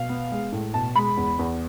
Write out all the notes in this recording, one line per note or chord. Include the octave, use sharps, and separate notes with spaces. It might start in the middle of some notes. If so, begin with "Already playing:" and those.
Already playing: B2 F5
B3
G#3
A2
B2 A5
G#3 B5
E2
E2